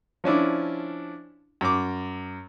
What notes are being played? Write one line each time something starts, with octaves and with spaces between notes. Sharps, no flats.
F3 C#4 D4 E4
F#2 D6